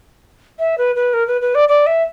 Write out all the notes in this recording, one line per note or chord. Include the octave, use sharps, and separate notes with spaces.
E5
B4
B4
A#4
B4
B4
D5
D5
E5